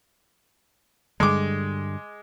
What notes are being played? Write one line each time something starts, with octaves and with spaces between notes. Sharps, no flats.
G2 D3 G3 G#3 D6